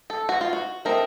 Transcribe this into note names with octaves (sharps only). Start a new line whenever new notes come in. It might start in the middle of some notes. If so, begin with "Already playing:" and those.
A4
F#4
F4
F#4
A3 C4 D#4 A#4